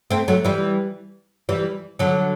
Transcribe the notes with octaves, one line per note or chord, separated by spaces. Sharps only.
A3 C4
F#3 A3
E3 G3
E3 G3
D3 F#3